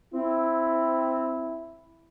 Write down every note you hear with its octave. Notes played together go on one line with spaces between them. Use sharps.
C4 E4